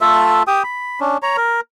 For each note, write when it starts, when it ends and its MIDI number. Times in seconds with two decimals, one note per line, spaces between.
0.01 0.43 57
0.01 0.43 65
0.01 0.43 69
0.01 0.43 76
0.47 0.63 67
0.47 0.63 79
0.47 0.63 87
0.63 1.00 83
1.00 1.17 61
1.00 1.17 62
1.23 1.37 73
1.23 1.37 82
1.37 1.61 70